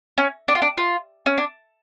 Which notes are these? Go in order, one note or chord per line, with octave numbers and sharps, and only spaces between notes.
C#4
D4
F4
D4
F4
C#4
D4